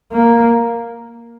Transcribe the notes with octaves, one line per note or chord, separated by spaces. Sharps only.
A#3